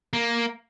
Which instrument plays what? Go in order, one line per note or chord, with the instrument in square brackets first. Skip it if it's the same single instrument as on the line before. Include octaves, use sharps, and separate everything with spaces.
[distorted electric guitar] A#3